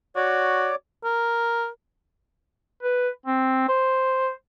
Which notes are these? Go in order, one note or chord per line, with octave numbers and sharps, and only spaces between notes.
F#4 C#5 D5 D6
A#4
B4
C4
C5